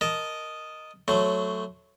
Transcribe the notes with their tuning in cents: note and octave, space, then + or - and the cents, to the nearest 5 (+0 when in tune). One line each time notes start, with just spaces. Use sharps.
A#4 +0 D#5 +0 A5 -15
F#3 +0 A3 +0 C5 -25